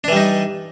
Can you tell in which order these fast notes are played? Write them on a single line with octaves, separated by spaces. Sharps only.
D4 E3 G3 D#4